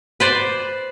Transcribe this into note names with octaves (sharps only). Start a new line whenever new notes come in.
B4 C5 D5